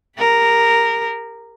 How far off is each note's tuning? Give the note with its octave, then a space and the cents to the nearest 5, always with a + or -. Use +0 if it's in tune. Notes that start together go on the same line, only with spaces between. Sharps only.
G4 +35 A#4 -5